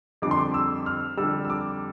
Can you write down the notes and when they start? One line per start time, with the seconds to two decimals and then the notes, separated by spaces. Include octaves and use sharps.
0.22 F2 D3 G3 D6
0.31 C6
0.38 D6
0.54 E6
0.86 F6
1.17 F2 D3 G3 E6
1.45 E6
1.50 D6